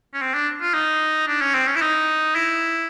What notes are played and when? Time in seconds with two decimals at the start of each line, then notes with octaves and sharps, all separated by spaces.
0.14 C#4
0.21 C4
0.34 D4
0.62 F4
0.74 D#4
1.28 D4
1.41 C#4
1.54 C4
1.68 C#4
1.76 E4
1.82 D#4
2.35 E4